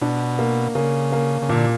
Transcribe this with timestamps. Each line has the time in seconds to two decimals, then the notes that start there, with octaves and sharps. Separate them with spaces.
0.01 B2 D4
0.39 A#3
0.75 C#3 A#3
1.12 A#3
1.42 C#3
1.49 A#2 D3